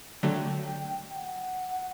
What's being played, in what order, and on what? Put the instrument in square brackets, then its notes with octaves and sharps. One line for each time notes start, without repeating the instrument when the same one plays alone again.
[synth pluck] D3 F#3 A3 [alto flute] G5
[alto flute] G5
F#5